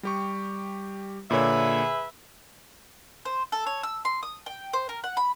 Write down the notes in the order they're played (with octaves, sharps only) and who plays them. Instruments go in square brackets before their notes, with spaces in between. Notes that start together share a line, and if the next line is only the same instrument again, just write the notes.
[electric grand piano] G3 G4 C#6
[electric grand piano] A#2 D3 C#5 [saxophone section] G#4 B4 E5
[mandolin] C5
A4
C#5
E6
C6
D#6
G5
C5
A#4
F#5
B5